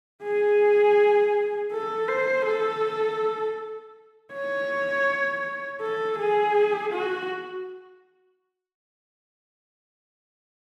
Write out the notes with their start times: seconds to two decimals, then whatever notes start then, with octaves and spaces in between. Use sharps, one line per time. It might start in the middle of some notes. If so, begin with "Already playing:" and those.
0.23 G#4
1.72 A4
2.08 C5
2.46 A4
4.33 C#5
5.81 A4
6.19 G#4
6.93 F#4